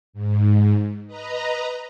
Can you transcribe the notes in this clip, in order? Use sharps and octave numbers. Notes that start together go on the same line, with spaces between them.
G#2
B4 D#5 A#5